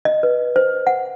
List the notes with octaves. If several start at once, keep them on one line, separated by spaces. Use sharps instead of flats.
D#5
B4
C5
F#5